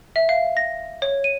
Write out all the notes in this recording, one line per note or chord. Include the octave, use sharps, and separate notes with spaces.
E5
F5
A#6
C#5
D#7